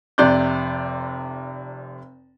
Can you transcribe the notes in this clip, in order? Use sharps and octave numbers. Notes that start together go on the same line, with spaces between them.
F1 C3 D5 F#6 G6